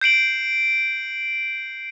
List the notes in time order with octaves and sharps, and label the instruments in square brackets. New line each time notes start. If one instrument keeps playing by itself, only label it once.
[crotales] G6 C7 D7 F#7